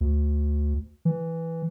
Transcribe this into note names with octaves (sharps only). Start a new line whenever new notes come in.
D2
E3